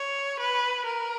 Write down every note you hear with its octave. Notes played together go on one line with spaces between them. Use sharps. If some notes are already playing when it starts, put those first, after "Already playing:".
Already playing: C#5
B4
A#4